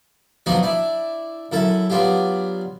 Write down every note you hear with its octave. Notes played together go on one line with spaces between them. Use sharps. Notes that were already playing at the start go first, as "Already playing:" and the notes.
F3 F#3 B3 D4 D#4 F#4
D4 E4
F#2 E4 A4 A5
F#3 B3 D4 F4 G4